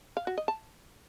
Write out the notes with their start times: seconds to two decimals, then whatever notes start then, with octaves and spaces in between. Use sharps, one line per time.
0.17 F5
0.27 F#4
0.38 D#5
0.48 A5